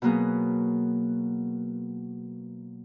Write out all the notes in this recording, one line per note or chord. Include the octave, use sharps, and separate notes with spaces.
B2 F#3 A#3 B3 G#4